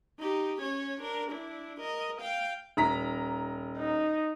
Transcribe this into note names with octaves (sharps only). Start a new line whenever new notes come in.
D#4 G4
C#4 C#5
D4 A#4
D4 E4
A#4 D#5
F5 G5
D#1 A#5 B6
D#4